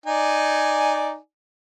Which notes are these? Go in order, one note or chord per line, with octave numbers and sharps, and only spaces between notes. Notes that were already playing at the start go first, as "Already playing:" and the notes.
D#4 D5 G#5